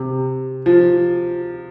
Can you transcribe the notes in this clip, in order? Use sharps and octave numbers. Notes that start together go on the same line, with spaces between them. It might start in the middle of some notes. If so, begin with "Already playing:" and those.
Already playing: C3
F3